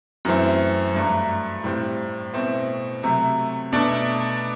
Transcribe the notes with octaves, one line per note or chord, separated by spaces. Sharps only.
F#2 E3 A3 C4
G2 F#3 A3 D4
A2 G3 C4
B2 A3 C4 E4
C3 F#3 A3
B2 A3 D4